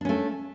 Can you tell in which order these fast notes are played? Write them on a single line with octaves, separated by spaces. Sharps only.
D4 C#4 A3